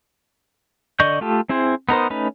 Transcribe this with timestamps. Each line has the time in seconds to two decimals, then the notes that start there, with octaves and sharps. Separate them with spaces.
1.00 D3 D5 D#5 C#6 G6
1.21 A3 F4 G4 A4
1.49 C4 E4 G#4 C5
1.89 B3 D#4 A#4 C5
2.10 A3 C#4 D#4 B4